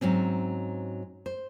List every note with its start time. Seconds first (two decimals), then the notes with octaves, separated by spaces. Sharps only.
0.01 G#2 F#3 C4 C#4
1.26 C5